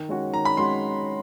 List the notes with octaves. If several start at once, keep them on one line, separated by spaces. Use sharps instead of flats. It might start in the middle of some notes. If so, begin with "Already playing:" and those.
Already playing: D#3
G#3 C#4 F#4
D#3 A#5
B5
G#3 C#4 F#4 C6